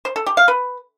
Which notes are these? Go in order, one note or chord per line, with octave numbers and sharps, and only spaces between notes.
C5
A4
G4
F5
B4